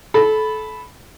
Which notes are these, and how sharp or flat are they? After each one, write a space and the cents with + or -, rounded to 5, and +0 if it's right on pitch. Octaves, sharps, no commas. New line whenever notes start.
A4 -25 B5 +0